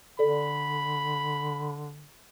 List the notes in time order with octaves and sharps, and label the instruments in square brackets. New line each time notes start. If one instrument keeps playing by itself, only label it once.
[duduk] D3 [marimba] A4 D5 [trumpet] B5